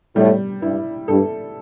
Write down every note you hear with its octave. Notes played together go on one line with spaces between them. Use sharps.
A2 G3
G2 E4
G2 A4